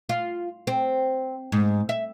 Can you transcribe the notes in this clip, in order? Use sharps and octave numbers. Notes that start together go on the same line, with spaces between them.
F4
C4
G#2
E5